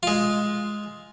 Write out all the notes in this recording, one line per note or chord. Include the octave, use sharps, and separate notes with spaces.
G#3 F4